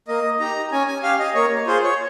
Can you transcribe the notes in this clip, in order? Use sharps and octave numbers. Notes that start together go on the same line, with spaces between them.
A#3 D#5
D#4 G4 A#5
C#4 G#5
G#5
G4 F5
D#5
A#3 C#5
F4 G#4 C5
C#5